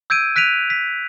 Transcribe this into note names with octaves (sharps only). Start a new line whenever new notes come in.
E6 G6 G#6 D7 D#7
F#6 B6 D7 D#7 F7
B6